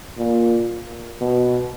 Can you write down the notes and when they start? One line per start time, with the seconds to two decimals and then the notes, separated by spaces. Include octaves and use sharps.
0.18 A#2
1.21 B2